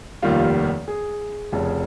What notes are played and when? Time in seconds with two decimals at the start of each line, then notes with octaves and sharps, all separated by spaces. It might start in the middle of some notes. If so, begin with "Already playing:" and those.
0.22 F1 D#2 D#3 G3 F4
0.88 G#4
1.52 F1 F2 C#3